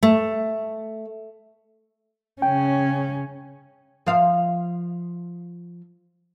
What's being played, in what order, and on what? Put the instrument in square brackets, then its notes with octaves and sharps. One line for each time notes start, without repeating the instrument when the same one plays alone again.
[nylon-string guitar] A3
[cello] C#3 C#4 [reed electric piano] G5
[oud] F3 C5 F5